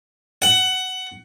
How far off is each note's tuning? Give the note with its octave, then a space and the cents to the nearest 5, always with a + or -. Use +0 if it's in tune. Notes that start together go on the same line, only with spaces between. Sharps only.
F#5 +15